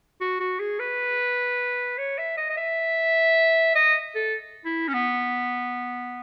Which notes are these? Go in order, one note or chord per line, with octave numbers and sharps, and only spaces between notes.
F#4
F#4
G#4
B4
C#5
E5
D#5
D#5
E5
D#5
A4
E4
C#4
B3